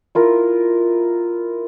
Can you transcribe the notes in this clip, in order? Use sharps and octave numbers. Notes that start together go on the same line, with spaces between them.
E4 F4 A#4